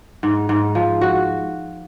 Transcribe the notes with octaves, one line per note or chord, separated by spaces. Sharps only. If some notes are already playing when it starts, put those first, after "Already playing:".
G#2
G#2
F3
F#4